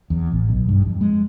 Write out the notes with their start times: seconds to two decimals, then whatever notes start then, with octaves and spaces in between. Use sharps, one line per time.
0.10 E2
0.32 A1
0.49 B1
0.69 G2
0.86 F2
1.01 G#3